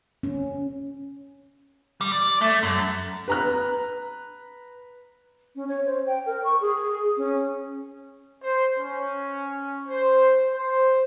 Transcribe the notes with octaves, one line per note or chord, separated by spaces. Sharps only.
C#4
G3
D5
A3
F#2
B4 A#5 F#6
C#4
C#5
C5
G5
A#4
C#6
G#4
C#4
C5
C#4
C5
C5